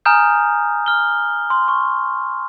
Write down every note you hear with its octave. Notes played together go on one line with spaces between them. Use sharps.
G#5 A#5 D#6 F6 G6
F6 G7
C6
C#6